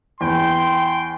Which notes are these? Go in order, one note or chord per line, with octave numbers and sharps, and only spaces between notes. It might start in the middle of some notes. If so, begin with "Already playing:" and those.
E2 G5 C6